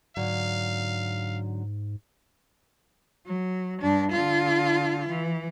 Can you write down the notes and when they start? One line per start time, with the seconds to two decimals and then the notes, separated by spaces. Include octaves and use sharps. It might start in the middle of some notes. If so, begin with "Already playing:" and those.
0.17 G#2 D3 F#3 F5
3.26 F#3
3.82 G2 D4
4.12 D3 F4
5.08 E3